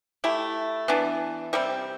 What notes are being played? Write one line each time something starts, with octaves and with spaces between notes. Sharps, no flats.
A3 E4 G4
E3 B3 D4
C3 G3 C4